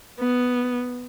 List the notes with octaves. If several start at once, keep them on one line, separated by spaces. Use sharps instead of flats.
B3